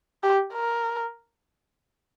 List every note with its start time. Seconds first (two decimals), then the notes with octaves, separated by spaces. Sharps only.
0.23 G4
0.53 A#4